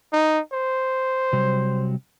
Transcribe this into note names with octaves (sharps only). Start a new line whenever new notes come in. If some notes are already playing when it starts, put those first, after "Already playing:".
D#4
C5
C3 F#3 G3